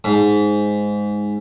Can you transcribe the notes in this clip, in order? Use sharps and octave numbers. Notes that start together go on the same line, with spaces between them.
G#2